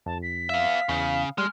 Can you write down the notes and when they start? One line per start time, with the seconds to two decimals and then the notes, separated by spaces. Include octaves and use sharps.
0.06 F2 A5
0.23 B6
0.50 B3 E5 F5
0.89 E2 C#3
1.38 G3 G#3 F6